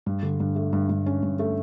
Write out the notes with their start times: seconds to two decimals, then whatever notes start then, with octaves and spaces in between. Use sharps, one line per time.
0.06 G2
0.23 D3
0.40 G2
0.56 A3
0.73 G2
0.89 G2
1.06 C#4
1.22 G2
1.39 A3